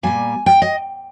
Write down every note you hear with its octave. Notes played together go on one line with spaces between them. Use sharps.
A#2 G3 A#3 G#5
G5
D#5